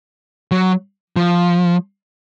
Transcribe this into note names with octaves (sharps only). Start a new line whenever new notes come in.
F#3
F3